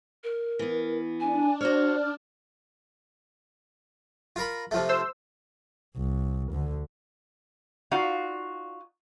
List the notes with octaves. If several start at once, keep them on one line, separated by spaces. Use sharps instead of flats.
A#4
E3 B3
D4 G#5
F#4 C5 C#5 F6
F4 A#4 B5
C3 F3 A3
C5 E6
C2
D2 D3
D#4 F4 F#4 D5 F5